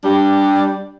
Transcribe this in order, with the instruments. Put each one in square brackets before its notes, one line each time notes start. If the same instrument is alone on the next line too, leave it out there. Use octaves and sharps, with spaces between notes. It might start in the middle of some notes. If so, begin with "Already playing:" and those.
[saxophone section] G3 D4